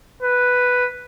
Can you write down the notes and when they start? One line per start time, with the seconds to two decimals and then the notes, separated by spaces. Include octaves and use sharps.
0.23 B4